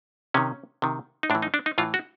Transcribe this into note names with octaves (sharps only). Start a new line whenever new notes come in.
C3 D#3 C#4
C3 D#3
D#4
A2 D4
E3
D#4
D4
D#4
A2 E3 F4
F#4